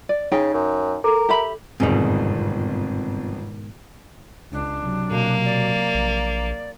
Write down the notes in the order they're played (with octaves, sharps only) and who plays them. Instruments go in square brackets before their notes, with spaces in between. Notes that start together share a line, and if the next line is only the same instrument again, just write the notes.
[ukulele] D5
[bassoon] C#3 [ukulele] D#4 G#4 G5
[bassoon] F#2
[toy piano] A4 [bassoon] A#4
[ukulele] G4 E5 B5
[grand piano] G1 F2 [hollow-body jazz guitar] G#2 B2 D#3
[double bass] C#2 [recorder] D4
[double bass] C3 F#3
[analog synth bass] B2 [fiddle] A#3
[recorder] D5
[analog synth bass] A#1